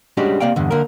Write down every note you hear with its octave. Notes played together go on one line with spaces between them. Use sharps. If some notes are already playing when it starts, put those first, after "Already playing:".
G3 G#3 C#4 D4 F#4 G4
C3 A#3 D5 F5 G5
E2 G2 D3
D3 A#3 A#4